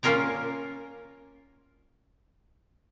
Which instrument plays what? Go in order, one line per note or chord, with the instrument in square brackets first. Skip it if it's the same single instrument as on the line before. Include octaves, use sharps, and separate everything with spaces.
[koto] A#3 C#4 F4 A#4 C#5 D5